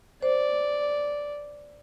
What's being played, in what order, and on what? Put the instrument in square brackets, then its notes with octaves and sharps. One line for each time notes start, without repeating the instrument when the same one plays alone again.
[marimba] C5 [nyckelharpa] D5